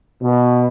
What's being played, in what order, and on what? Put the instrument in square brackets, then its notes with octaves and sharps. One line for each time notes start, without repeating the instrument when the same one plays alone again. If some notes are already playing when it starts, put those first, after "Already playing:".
[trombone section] B2